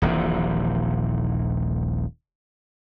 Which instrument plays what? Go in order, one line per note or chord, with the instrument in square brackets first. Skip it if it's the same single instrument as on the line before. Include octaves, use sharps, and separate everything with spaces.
[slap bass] D#1 A#1 C3 E3